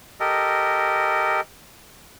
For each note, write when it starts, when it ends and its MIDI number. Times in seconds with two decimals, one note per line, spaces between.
0.20 1.41 67
0.20 1.41 69
0.20 1.41 70
0.20 1.41 75